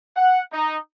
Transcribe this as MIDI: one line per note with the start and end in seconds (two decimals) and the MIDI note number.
0.16 0.40 78
0.52 0.77 63